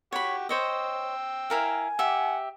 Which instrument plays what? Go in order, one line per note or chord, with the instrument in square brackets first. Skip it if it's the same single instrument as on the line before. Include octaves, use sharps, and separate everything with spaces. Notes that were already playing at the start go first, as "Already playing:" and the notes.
[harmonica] F#4 G4 [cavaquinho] C#5 B5
[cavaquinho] C5 C#5 D#5 [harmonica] G5 E6
[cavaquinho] E4 A#4 F5 [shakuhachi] G#5
[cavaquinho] G4 E5 [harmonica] F#5